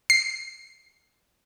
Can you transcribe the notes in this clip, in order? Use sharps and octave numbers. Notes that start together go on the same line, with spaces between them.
C7